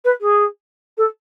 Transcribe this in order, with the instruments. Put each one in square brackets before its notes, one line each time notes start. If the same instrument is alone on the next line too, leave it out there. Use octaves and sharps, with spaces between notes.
[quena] B4
G#4
A4